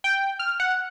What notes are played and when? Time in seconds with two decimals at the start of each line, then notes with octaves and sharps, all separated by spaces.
0.04 G5
0.39 F6
0.60 F#5